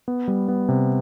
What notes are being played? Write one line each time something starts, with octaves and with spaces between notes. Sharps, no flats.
B3
G3
B3
C3